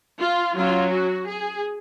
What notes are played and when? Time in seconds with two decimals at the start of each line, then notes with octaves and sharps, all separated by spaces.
0.19 F4
0.55 F#3 C#4 F4
0.90 F#4
1.26 G#4